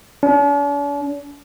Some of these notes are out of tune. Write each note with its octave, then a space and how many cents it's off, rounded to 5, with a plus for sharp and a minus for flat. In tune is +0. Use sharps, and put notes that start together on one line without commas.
D4 -45